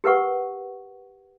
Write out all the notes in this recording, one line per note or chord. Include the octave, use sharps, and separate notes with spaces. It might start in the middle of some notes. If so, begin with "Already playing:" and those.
G4 A#4 B4 F#5 C#6